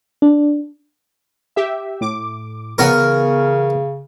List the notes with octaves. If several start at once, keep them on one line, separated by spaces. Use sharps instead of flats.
D4
G4 E5
A2 D6
C#3 E3 B3 A#4 C#5 G#5